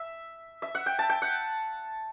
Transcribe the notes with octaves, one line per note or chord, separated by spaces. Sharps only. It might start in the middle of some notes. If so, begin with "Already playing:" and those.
Already playing: E5
E5
F#5
G5
A5
G5
F#5